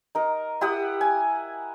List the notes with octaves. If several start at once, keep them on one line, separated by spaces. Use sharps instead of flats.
D#4 A#4
E4 G4 F#5 D#6
G#5